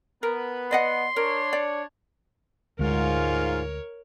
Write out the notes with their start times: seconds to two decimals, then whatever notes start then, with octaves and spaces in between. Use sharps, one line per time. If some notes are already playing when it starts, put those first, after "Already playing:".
0.23 B3 A#4 B4
0.71 D5 D#5 F#5 C6
1.16 D4 A#4 C#5
1.53 D5
2.79 D2 G#2 G#3 F4 A#4 C#5